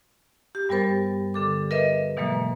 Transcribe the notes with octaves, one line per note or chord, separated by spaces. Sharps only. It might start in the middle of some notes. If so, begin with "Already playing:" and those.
G4
G2 G3 B3 A#4 C5 A6
D3 A4 D6
A#4 B4 D#5 E5
B2 E3 F#3 G#3 A#3